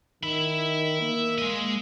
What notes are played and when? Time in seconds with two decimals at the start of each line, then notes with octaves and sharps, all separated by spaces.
0.23 D#3 E5 B5
1.01 A#3
1.38 G#3 D#5